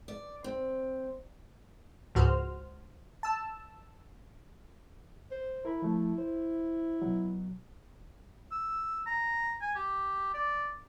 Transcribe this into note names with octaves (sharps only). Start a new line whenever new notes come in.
D5
C4
C#2 G#2 F#4 C5 F6
A5 E6
C5
E4 A#4 B5
F3 A3
C5
B2 F#3
E6
A#5
G#5
G4
D5